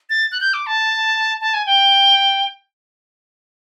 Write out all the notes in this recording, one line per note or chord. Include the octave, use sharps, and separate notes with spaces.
A6
F#6
G6
D6
A5
A5
G#5
G5